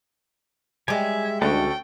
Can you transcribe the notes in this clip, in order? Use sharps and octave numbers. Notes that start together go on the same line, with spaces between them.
G3 G#3 E5 G#5
D2 C#4 F#4 A4 G5